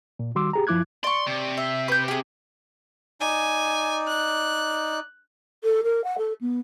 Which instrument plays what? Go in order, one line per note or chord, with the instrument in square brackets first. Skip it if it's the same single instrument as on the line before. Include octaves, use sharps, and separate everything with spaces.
[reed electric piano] A#2
D#3 G3 F#4 C6 D6 E6
G4 G#4 A#5
F#2 F3 E4 D6 F#6 G#6
[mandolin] D5 C#6 [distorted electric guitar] C6
[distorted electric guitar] C3
[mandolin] E5
B4 G6
G4 G#4
[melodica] D#4 D5 [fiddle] G#5
[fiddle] F#6
[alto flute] A4
A#4
F#5
A4
B3